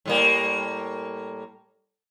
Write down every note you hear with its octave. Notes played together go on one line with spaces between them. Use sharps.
A2 G3 A#3